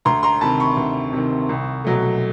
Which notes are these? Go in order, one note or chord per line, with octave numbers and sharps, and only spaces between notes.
D2 A#5 C6
A#5 C6
C3 D#3 A5 B5
B5 C#6
D2
C3 D#3
C2
B2 F#3 A3